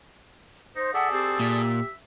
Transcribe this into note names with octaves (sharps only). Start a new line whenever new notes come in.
D#4 C5
G#4 A4 D5 E5 F#5
C4 G4
A#2 E5